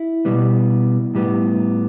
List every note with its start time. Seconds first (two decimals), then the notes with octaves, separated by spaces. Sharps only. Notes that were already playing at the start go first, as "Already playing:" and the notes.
Already playing: E4
0.25 B2 G3 B3
1.15 A2 G3 B3